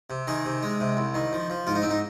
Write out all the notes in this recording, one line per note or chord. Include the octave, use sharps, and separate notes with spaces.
C3
D#3 G#4
C3
G#3
C3
C2
D#3
F3
F3
G#2 F4
D#4
G#2 C4
D#4